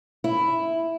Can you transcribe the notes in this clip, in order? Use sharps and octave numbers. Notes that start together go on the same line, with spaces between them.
E4